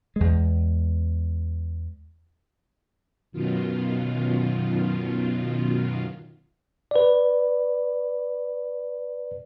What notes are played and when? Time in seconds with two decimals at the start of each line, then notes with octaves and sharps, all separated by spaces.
0.16 E2 G#3
3.32 F#2 B2 D#3 F4
6.91 B4 D5